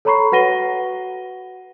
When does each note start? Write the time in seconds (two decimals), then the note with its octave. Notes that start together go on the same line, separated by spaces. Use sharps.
0.05 A4 C#5 A#5 B5 C#6 C7
0.32 F#4 B4 F#5 A#6 D#7 G7